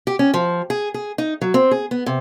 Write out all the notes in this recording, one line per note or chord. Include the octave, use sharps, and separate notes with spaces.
G4
C#4
F3
G#4
G#4
D#4
F#3
C4
G#4
B3
C3